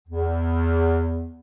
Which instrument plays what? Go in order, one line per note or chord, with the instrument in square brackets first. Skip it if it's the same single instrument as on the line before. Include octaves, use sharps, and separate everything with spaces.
[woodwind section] E2